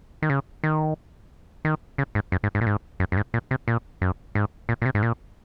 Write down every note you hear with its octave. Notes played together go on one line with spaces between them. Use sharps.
D#3
C#3
D#3
D#3
C#3
G#2
F#2
G#2
G#2
A#2
G#2
F#2
F#2
G#2
A#2
C3
A#2
F#2
G#2
A#2
A#2
C3
G#2
A#2